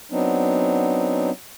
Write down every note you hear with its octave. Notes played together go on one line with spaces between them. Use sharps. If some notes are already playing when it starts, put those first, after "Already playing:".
F#3 B3 C4 D4 D#4